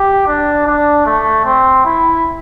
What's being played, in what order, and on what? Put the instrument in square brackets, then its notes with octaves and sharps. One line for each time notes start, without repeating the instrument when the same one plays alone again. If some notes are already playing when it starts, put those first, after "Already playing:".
Already playing: [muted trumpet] G4
D4
D4
A3
C4
E4